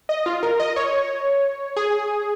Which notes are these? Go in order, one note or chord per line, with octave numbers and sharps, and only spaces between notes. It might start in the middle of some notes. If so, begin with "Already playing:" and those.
D#5
F4
A#4
D#5
C#5
G#4